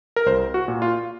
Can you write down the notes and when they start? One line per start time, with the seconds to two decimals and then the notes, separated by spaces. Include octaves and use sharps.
0.16 A#4
0.26 C2 C5
0.54 F#4
0.68 A#2
0.82 F4